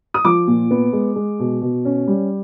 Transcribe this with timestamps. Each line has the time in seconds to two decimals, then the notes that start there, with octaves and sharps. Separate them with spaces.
0.14 D#6
0.24 F3 D6
0.47 A#2
0.71 B3
0.93 G#3
1.16 G#3
1.39 B2
1.62 B2
1.85 C#4
2.08 G3